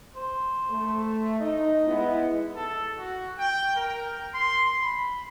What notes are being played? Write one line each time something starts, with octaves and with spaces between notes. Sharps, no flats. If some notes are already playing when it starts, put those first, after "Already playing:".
C5
A3
D#4 D#5
G#3 B3 E4
A4
F#4
G5
A#4
C6
B5